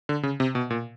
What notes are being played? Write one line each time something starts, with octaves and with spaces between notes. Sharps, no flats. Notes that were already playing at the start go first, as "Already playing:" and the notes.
D3
C#3
C3
B2
A#2